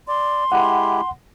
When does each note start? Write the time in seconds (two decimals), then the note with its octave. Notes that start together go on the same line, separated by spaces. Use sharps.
0.08 D5 C6
0.52 G#3 E4 G4 F#5